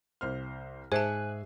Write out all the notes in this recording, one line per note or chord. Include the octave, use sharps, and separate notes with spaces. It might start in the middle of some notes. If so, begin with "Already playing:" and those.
C2 C5 F6
G#2 G#4 C5 E5 G#5 A5 F#6